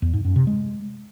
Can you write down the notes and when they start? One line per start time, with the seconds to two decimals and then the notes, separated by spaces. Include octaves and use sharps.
0.02 E2
0.13 G#2
0.25 F#2
0.36 C3
0.47 G#3